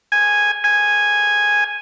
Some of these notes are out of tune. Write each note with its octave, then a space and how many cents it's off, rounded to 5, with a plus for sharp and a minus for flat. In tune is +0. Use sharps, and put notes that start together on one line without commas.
G#5 -5
G#5 -5